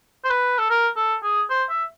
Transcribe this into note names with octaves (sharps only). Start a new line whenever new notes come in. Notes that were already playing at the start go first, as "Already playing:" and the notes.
C5
B4
A4
A#4
A4
G#4
C5
E5